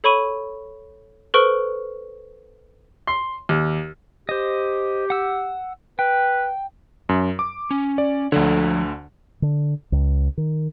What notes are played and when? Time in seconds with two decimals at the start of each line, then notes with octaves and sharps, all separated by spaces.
0.04 A4 C#5 B5 C#6 D#7
1.34 A4 B4 C5 C#6 F6 D7
3.07 C6
3.49 D#2
4.29 G4 C5 D#5
5.10 F#5 E6
5.99 B4 G5
7.09 F#2
7.39 D6
7.71 C#4
7.98 D5
8.32 D2 D3 F3 C#5
9.42 D3
9.92 C#2
10.37 D#3